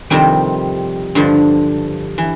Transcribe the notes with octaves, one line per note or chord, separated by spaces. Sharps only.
F2 C3 D#3 G3 C4
G2 D3 F3
E3